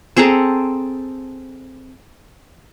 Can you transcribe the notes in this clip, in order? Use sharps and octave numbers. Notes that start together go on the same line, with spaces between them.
C4 G#4 A4 A#5